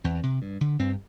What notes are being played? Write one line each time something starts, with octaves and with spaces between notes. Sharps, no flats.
E2 C4
C3
G2
D3
G2 C4